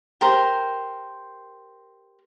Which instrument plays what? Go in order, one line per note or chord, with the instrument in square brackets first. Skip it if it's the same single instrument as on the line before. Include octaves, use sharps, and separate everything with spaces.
[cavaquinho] G4 A#4 C5